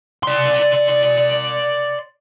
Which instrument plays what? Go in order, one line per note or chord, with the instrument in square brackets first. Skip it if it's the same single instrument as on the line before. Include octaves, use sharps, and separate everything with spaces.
[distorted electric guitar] D5 C6